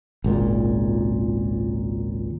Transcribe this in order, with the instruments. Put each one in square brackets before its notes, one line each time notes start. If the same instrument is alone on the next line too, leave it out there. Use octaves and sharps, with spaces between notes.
[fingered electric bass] G#1 C#2 A#2